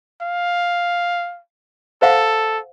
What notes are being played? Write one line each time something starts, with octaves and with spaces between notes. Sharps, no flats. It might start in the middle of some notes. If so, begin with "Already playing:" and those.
F5
A4 C5 F5 F#5